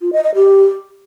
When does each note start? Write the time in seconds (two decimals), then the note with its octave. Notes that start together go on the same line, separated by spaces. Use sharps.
0.01 F4
0.13 D#5
0.24 D#5
0.35 G4